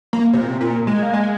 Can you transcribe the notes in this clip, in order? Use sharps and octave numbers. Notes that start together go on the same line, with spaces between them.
A#3
C3
A#2
C3
A#2
G#3
A#3
G#3